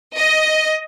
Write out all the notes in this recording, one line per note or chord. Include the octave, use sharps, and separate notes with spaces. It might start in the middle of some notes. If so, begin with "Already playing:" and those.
D#5